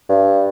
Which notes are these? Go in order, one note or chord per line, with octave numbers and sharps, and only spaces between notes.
G2